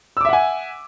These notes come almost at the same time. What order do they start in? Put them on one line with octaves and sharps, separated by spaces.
E6 D6 E5 F#5 G#5